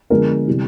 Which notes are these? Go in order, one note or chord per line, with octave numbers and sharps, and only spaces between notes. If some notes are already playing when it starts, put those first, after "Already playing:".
D3 F3 G#3 B3 A#4
C3 E3 G3